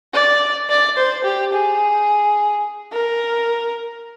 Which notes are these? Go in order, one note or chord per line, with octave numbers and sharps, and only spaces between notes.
D5
D5
C5
G4
G#4
A#4